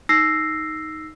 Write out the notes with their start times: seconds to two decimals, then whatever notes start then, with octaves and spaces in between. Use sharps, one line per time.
0.09 D#4 E6 A#6 C7